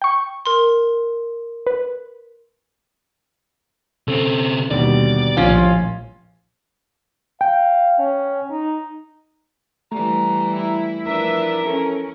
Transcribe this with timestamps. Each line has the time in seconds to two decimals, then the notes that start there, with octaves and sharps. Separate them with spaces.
0.02 G5 C#6
0.46 A#4 C6
1.66 B4
4.08 C#3 C4 A4
4.71 D#2 B2 D3 G3 D5
5.37 A#1 A2 F3 C#4 F4
7.41 F5 G5
7.99 C#4
8.50 D#4
9.92 E3 G3 A3 A#5
10.50 E4
11.06 F3 D4 E4 A#4 B4 E5
11.67 C#4 A4